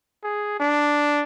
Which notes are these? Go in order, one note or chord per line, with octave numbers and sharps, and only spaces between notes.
G#4
D4